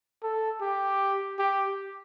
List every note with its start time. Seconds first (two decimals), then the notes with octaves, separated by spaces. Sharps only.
0.23 A4
0.61 G4
1.39 G4